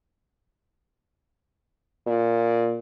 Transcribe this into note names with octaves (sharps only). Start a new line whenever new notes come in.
A#2